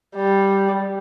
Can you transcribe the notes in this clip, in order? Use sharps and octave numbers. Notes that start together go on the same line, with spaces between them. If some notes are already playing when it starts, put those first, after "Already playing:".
G3